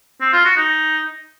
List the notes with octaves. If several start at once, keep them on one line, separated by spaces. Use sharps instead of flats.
C4
F4
F#4
D#4